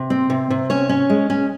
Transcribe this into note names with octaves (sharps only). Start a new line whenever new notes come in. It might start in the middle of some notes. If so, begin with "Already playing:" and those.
Already playing: C3
C4
C3
C3
C#4 C#5
C#4
G#3
C#4